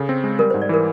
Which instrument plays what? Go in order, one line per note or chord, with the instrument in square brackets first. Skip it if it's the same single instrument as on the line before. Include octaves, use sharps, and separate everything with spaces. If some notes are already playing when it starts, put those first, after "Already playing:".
Already playing: [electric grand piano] C#3 [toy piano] A4
[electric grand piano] C4
G#3
[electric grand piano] G3 [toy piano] A#4
[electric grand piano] G#2 [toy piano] C5
[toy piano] D5
[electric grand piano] E3 [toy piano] A#4